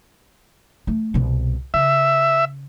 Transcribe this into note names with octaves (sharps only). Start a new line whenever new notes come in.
A3
C2 B2
C#3 E5